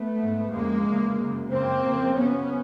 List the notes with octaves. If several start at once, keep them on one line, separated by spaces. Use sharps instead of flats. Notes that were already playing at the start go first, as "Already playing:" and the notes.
Already playing: A3 B3
G#2
F2 C#3 G#3 A#3
E2 C#3
F#2 C#3
F#2 C#3 A#3 C4
F2 C#3
F#2 C#3 B3 C#4